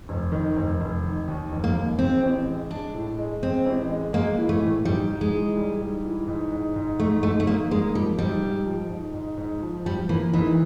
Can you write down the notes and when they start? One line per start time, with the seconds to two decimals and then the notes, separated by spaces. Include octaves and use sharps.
0.09 F1
0.32 D#3
0.57 F1
0.81 F1
1.04 D#3
1.28 D#2
1.52 F1
1.64 A#3
1.76 D#2
1.99 G#3 C4
2.23 A1
2.47 G#3
2.71 G#3 D4
2.94 A2
3.18 G#3
3.42 G#3 C4
3.66 A1
3.90 G#3
4.13 G#3 A#3
4.38 E3
4.49 A3
4.61 A2
4.85 G#2 G3
5.09 G#2
5.21 G#3
5.32 E3
5.57 G3
5.81 G#2
6.05 E3
6.28 G#2
6.52 G#2
6.76 G#2
7.00 G#2 A3
7.23 G#2 A3
7.40 A3
7.47 G#2 A#3
7.71 G#3 A#3
7.95 F3 G3
8.18 G#2 G3
8.42 G#2
8.66 F3
8.90 G#2
9.14 G#2
9.37 G#2
9.62 F3
9.85 F3 G3
10.09 E3 A#3
10.33 G#2 E3